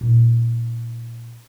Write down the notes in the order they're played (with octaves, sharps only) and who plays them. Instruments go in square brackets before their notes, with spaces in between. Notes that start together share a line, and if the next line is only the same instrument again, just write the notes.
[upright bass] A#2 D#4